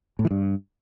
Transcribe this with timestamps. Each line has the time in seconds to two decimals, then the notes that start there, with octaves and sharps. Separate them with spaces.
0.19 A2
0.25 E3
0.31 G2